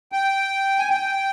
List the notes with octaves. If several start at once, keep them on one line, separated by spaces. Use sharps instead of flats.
G5
G#5
G5